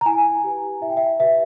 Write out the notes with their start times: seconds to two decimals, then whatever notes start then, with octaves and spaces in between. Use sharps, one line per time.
0.01 A#5
0.06 E4 G#5
0.44 G4 B4
0.81 E4 E5
0.90 G5
0.97 E5
1.19 G4 B4 E5